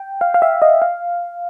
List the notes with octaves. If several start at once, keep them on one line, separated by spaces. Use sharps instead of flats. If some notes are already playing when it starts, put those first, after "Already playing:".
Already playing: G5
F5
F5
E5
D#5
F5